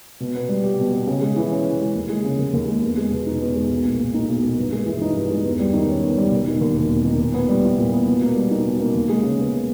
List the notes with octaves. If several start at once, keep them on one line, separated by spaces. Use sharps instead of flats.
B2
B3
G3
G4
B2
B3
C#3
G#3
E3
C#4
C#3
G#3
D#2
G#3
C#3
D#2
D#2
G#3
E2
G#3
B2
D#4
E2
G#3
B1
A#3
A#2
D#4
B1
A#3
G2
G#3
E3
D#4
G2
G#3
E2
G3
D#3
C#4
E2
G3
E1
D#3
D#2
E1
E1
D#3
A#2
B3
G3
E4
A#2
B3
B2
A#3
G3
D#4
B2
A#3
D#2
G#3
C#3
B3